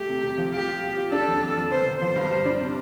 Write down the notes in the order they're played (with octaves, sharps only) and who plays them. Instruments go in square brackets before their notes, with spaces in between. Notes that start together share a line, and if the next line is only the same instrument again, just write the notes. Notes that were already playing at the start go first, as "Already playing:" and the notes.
Already playing: [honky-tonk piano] A3 [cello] G4
[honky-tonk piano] C3
C3
F3
[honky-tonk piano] F4 [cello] G4
[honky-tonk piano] F4
F4
F4
[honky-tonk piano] D4 [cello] A4
[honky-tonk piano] F2
F2
F2
[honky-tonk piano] G1 [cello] C5
[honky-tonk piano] G1
[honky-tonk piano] F3 [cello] C5
[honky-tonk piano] G2
G3
D4
C3